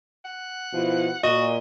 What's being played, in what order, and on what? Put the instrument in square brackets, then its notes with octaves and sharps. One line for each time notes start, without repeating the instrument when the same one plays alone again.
[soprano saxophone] F#5
[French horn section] B2 F3 E4
[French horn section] A#2 [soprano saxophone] F#4 [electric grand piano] D#5